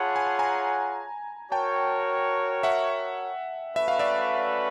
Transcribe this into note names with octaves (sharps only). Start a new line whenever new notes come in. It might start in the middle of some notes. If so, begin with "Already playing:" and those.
Already playing: F4 G#4 C#5 F#5 A5 B5
G#5
A5
G#5 A#5
F#4 A#4 C#5 G5 A5
E5 F#5
A3 C#4 F#4 B4 E5
F5
D5 E5